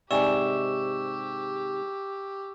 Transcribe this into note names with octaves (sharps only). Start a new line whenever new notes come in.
G#2 C3 G4 D5 G#5 C#6 E6 E7